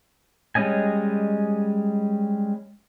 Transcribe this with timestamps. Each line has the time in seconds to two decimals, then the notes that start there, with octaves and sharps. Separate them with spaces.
0.55 G3 G#3 C#4 D#5 G#5